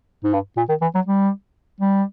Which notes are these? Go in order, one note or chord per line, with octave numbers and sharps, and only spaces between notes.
G#2
G2
A#2
D#3
E3
F#3
G3
G3